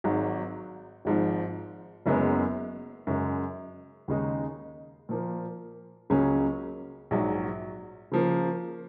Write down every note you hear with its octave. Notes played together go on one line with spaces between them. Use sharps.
G#1 G#2 F#3
G#1 G#2 F3
F#1 F#2 C#3 G#3 B3
F#2 C#3 G#3
D#2 C#3 G#3 D#4
A#2 F3 A#3
C#2 C#3 F#3 A#3 C#4
A#1 G#2 F#3
C#3 F3 A#3